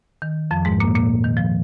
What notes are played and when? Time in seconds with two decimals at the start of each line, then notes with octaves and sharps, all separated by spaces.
0.22 D#3
0.51 F2 F3
0.65 G#2 G#3
0.80 A#2 A#3
0.95 A#2 A#3
1.24 D#3
1.37 F3